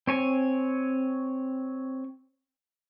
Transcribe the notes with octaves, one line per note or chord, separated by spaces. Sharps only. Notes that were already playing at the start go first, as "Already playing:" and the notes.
C4 C#5 G#5